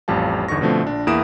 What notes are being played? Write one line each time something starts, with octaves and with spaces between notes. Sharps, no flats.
A1 F2 G3 F5 A5
G1 E2 D3 D#4 C#6 A#6
B2 D3 F3 A3 C4
A#1 D4
E2 A#3 E4 D#6 D7 E7